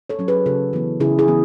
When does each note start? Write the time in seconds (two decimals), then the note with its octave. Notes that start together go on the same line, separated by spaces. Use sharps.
0.10 A4 C#5
0.19 F#3 C#4
0.28 G#4 B4
0.46 C#3 F#4 A4
0.73 E3 B3
1.00 C#3 E4 G#4
1.19 E4 G#4
1.28 E3 B3